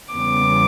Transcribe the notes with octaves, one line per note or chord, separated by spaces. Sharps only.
E2 C#3 G3 B3 D6